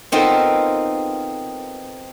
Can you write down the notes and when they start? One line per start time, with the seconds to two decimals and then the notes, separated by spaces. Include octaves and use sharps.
0.12 B3 C4 D#4 F4 A4 A#4